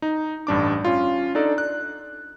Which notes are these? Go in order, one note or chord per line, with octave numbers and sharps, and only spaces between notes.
D#4
A1 G2 D4 D6
C#4 F4
D4 D#4 A4 D5
F#6